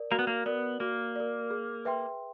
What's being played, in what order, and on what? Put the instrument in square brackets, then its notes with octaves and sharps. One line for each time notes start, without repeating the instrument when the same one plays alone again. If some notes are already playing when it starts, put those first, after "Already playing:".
Already playing: [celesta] A#4 D5
[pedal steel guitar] A#3 [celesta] F#4
[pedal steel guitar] B3
A#3
[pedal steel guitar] B3 [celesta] A#4 D5
[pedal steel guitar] A#3 [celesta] F#4
[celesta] A#4 D5
G#4
B4 E5 G5 C6